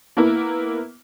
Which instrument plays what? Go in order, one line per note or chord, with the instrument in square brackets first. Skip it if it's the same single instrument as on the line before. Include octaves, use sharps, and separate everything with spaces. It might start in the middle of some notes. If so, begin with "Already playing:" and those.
[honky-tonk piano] A#3 B3 E4